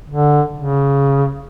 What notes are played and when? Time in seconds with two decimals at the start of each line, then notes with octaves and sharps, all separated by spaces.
0.10 D3
0.58 C#3